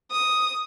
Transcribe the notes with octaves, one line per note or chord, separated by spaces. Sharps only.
D#6